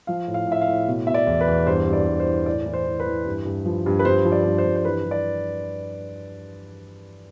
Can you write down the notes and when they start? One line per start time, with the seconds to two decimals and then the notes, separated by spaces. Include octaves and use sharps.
0.07 F3 F5
0.27 A2
0.34 F5
0.47 A2 E5
0.61 F5
0.68 A2
0.87 B2
1.07 B2 E5
1.14 D5
1.27 E2
1.41 B4
1.47 E2
1.66 G2 C5
1.87 G2
1.93 D5
2.07 G2
2.20 C5
2.27 E3
2.46 A2 D5
2.66 E3
2.74 C5
2.86 E3
3.00 B4
3.06 E3
3.26 G2
3.45 G2
3.66 F3
3.86 G2
3.99 B4
4.05 G2 C5
4.25 F3
4.32 D5
4.45 G2
4.58 C5
4.65 G2
4.76 C5
4.84 E3 B4
5.04 G2
5.11 D5